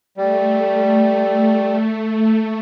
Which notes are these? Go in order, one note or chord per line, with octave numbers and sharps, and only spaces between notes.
G3 A3